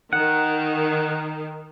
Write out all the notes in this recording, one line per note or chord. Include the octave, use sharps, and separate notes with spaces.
D#3 F#5